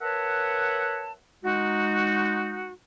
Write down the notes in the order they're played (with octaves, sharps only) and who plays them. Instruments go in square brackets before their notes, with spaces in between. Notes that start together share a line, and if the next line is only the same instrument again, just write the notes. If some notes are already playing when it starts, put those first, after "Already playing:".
[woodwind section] A#4 B4 C#5 E5 F#5 A5
G#3 D#4 F#4